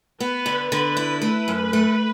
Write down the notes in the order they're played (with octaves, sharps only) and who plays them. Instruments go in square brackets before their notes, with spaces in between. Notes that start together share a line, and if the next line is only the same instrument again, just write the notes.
[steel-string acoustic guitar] B3 [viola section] B4
[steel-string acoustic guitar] D3
[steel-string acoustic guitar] D3 [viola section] B4
[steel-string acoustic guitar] E4
[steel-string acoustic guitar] A3 [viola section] B4
[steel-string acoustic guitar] F#2
A3